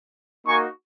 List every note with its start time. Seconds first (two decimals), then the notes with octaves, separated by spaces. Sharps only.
0.46 A#3 D#4 F#4 G#5 C#6